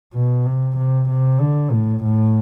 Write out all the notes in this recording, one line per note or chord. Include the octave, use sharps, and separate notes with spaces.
B2
C3
C3
C3
D3
A2
A2